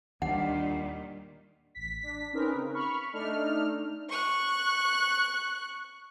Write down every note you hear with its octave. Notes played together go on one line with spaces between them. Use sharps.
D#2 A#2 D#3 G3 D4 F#5
A1 B6
D4 B6
C4 C#4 D#4 G#4 A#4 B4
C#3
B5 C#6 F6
A3 D4 D#4 F6
C#6 F#6